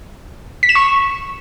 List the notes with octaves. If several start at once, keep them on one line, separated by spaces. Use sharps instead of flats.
B6
E7
C#6